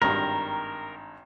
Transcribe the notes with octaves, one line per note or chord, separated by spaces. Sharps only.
G#1 G2 A#4 A#5